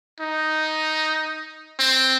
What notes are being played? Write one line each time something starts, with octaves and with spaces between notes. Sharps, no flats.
D#4
C4